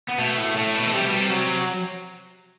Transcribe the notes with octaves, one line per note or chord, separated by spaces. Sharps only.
B3
B2 A3
A2
A2 A3
B2
A3
C3 G3
B2
C3
F#3